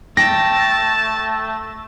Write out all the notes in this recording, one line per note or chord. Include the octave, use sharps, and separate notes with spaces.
A3 G5 A5 A#6